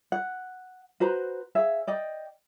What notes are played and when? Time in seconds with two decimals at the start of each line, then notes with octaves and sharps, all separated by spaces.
0.12 F#5
1.00 F#4 B4 C5 A#5
1.55 G#4 C#5 E5 F5
1.87 D5 D#5 G5